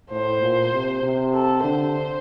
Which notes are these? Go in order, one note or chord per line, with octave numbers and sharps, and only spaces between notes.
A2 C5
A#2
C3
C3
A4
D3 C5